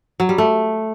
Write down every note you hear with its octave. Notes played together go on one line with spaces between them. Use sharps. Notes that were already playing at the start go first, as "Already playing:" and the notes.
F#3
G3
A3